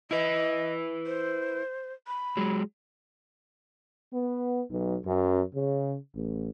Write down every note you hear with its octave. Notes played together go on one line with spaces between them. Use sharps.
E4 B4 D#5
C5
B5
F#3 G#3
B3
B1
F#2
C#3
A1